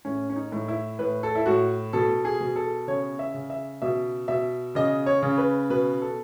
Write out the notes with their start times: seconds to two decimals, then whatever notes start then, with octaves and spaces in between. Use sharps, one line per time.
0.05 A2 C#4
0.30 C#4
0.36 D#4
0.52 A2
0.68 E4
0.99 A2 B4
1.23 A4
1.35 E4
1.46 A2 F#4
1.93 B2 A4
2.25 G#4
2.41 B2
2.56 A4
2.87 C#3 C#5
3.19 E5
3.34 C#3
3.50 E5
3.82 B2 E5
4.28 B2 E5
4.75 C#3 D#5
5.06 C#5
5.22 C#3
5.38 B4
5.70 B2 B4
6.02 A4